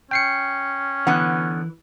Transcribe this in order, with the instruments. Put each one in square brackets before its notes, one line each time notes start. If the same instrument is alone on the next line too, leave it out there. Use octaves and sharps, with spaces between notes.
[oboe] C#4 [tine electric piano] G5 C7 C#7
[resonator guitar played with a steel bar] D3 B3 F#5 [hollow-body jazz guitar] E3